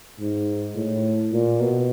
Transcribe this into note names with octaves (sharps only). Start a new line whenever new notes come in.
G#2
A2
A#2
B2